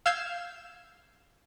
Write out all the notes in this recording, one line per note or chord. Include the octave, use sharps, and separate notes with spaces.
F5 E6 G6 G#6 C7 E7